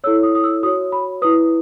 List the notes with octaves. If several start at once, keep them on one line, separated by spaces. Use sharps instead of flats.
E4 A4 C#5 E6
D#6
D#6
E6
F#4 C#5 D#6
B5
E4 B4 D#6